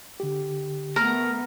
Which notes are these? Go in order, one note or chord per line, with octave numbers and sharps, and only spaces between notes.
D3 G4
A3 B3 A#4 A#5